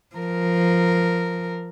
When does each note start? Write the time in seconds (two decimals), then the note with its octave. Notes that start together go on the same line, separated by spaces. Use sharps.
0.16 F3 A#4